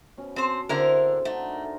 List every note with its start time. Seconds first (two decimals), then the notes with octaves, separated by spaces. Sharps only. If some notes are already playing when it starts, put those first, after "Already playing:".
0.17 B2 C#4
0.36 C4 C5 A5
0.69 D3 C4 E4 G#4 A#4 C5
1.25 A3 D4 D#4 F#5
1.53 A#4